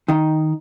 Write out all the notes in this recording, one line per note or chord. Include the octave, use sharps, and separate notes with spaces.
D#3 D#4